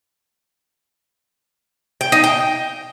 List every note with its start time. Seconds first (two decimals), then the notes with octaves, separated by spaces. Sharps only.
2.01 G5
2.12 D#4
2.24 G5